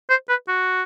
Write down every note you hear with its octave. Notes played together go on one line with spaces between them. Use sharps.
C5
B4
F#4